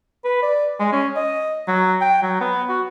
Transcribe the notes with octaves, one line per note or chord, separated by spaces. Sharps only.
B4
D5
G#3
C#4
D#5
F#3
G5
F#3
B3
F#4